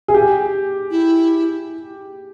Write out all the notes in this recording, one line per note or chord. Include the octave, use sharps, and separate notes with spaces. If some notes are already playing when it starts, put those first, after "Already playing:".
G#4
G4
E4